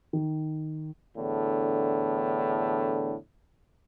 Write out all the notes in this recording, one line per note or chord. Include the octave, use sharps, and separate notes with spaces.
D#3
E2 A2 D3